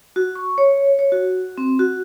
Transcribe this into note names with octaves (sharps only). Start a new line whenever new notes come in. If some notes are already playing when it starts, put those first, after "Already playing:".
F#4
C#6
C#5
C#5
F#4
C4
F#4